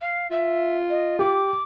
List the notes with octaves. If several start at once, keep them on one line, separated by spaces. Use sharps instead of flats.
F5
F4 E5
D#5
G4 D6